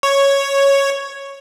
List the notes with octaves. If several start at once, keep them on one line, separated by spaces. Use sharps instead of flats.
C#5